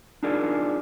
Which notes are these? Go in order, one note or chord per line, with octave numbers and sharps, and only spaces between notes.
D4 D#4 F4 G#4 A#4 D5